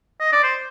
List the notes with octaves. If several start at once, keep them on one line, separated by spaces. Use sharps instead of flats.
D#5
D5
C5